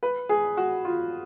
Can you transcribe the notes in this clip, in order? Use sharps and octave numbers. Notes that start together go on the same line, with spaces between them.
B4
G#4
F#4
F4